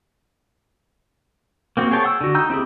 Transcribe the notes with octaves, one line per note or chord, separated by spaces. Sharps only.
A#3 C4 F#4
G#4 C#5 G5 A5 C#6
F#5 E6
D3 F#4
D#4 G5 A#5 E6 G6
C4 E4 G4 G#4